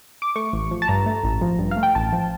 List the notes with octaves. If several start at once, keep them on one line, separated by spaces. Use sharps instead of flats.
D6
A3 C#6
A1
F3
A5
G2 A#5
A3
A1
F3
G2
F5
A3
G5
A1 A5
F3